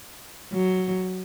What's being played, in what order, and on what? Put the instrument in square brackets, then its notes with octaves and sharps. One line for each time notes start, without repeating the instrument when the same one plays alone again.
[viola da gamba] F#3